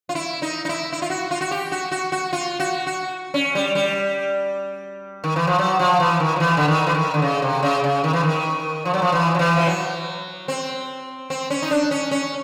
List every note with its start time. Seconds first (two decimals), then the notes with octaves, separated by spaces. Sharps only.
0.09 F4
0.15 E4
0.42 D#4
0.65 D#4
0.69 E4
0.92 E4
1.02 F4
1.10 F#4
1.31 F4
1.41 F#4
1.51 G4
1.72 F#4
1.92 F#4
2.12 F#4
2.33 F4
2.60 F#4
2.87 F#4
3.34 C#4
3.55 G3
3.75 G3
5.24 D#3
5.36 E3
5.47 F3
5.59 F#3
5.79 F3
6.00 E3
6.20 D#3
6.36 F3
6.40 E3
6.57 D3
6.68 D#3
6.87 E3
6.95 D#3
7.14 D3
7.22 C#3
7.42 C3
7.63 C#3
7.84 C#3
8.04 D#3
8.13 E3
8.23 D#3
8.85 F3
8.94 F#3
9.02 F3
9.12 E3
9.35 F3
9.39 E3
9.57 F3
9.67 F#3
10.48 C4
11.30 C4
11.50 C#4
11.62 D#4
11.71 D4
11.91 C#4
12.11 C#4